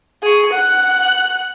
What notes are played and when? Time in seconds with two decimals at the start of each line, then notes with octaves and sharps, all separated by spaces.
0.23 G#4 C#6
0.53 F#5 F#6